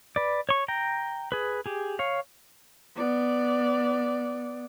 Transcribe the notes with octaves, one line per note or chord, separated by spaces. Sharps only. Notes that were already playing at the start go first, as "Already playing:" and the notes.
B4 D5
C#5 C#6
G5 A#5
G#4 B4
G4 G#4
C#5 F5
B3 D5